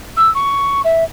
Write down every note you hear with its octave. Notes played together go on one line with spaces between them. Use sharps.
E6
C#6
E5